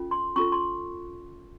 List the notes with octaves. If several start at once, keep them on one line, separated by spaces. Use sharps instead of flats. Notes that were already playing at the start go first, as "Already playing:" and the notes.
Already playing: C#4 F4 A4
C6
C#4 F4 A4 C#6
C6